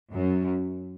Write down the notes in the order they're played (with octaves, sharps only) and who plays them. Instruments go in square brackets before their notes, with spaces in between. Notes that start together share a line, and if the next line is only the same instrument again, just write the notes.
[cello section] F#2